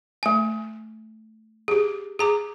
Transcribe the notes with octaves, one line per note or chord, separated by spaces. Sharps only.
A3 G#5
G4 G#4
G#4 A#5 D6